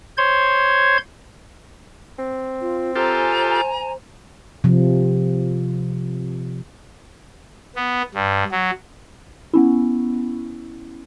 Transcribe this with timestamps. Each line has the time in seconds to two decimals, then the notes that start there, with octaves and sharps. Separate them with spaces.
0.18 C5 C#5 C6 G#6
2.19 C4
2.61 F4
2.96 F4 G4 A4 C5 G#5 A#5
4.64 C3 F3
7.76 B3
8.14 G2
8.52 F#3
9.54 B3 C#4 E4